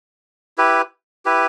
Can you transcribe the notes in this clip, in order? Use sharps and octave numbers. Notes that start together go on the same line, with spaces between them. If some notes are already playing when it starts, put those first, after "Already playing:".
E4 G4 B4
E4 G4 B4